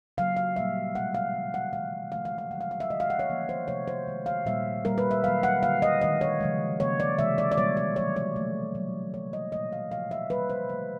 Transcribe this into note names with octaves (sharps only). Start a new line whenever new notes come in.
C#3 F#3 A#3 F5
F5
A#2 G3 A#3 E5
B2 G#3 F#5
F5
C#3 E3 G3
F#5
D#3 G#3 F5
C#3 F3 A3 F5
F5
F5
D3 F#3 A3 F#5
F5
F5
E5
D#3 G#3 D#5
F5
F#5
C#5
D3 F3 A#3
C5
C3 F3 A3 C#5
C5
D#3 G#3
F5
A#2 G3 A#3 E5
A#2 G3 A#3 A#4
B4
E5
D#3 F#3 A#3 F5
F#5
D3 G3 A#3 F5
D#5
D#3 G#3 D#5
C#5
C#3 F3 G#3
C#3 F3 A#3 C#5
D5
C3 E3 G#3 E5
D5
D5
B2 G3 A#3 C#5
D5
D#3 F#3 A3 C#5
C#5
B2 F#3 A3
B2 F#3 A#3
D3 F#3 A#3 C#5
D#5
A#2 F#3 A#3 D#5
F5
C3 F3 A3 F5
E5
C3 E3 G3 A#3 B4
C5
C#3 F3 A3 C5